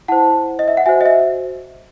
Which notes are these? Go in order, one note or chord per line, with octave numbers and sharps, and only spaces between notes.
E4 C5 F#5 A5
D#5
E5
F#5
F#4 C5 E5 G#5
D#5
E5